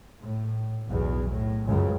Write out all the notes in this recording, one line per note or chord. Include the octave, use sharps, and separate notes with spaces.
A2
B1 E2
A2
C#2 F#2 C#3